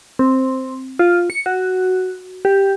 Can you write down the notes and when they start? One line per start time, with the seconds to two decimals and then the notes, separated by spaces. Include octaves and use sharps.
0.19 C4
0.99 F4
1.30 C#7
1.46 F#4
2.45 G4